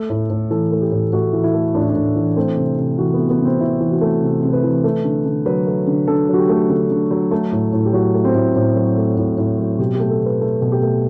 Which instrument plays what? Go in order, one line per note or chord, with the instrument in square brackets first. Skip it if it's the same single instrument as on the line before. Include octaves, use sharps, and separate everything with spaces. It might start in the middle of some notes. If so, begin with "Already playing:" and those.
Already playing: [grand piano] A3 A4
A2
A2
E3 A4
A3
G4
A2
A2 F#4
E3
E4
A3
A2 D4
E4
D4
A2
E3
A3 C4
C3
C3
E3 F#4
B3
A3
B3
C3
C4
C3 E4
E3
F#4
A3
C3
C3
B4
E3
A3
D3
D3
F#3 B4
A3
D3
D3 A4
F#3
F#4
G4
A3
D3 A4
D3
F#3
A3 A4
A2
A2
G4
F#3 F#4
A3
C4
A2
A2 C4
F#3
A3
A2
A2
F#3
B2 G4
A3 G4
A4
B2
B4
A3 A4
B2
G4
A3